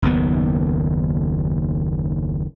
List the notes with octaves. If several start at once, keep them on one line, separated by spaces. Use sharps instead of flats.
F#1 D#2 D#3 B3